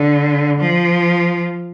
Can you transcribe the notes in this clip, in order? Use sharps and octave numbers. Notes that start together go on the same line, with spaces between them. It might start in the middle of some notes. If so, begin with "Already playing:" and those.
Already playing: D3
F3